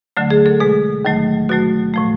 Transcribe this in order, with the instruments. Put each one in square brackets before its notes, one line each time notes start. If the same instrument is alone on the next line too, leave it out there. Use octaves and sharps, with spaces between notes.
[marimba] D2 D3 F#3 A3
G#4
A4
B2 G#3 G#4
D#2 D#3 F#3 A3
B2 F#3 A3 F#4
A2 F3 A3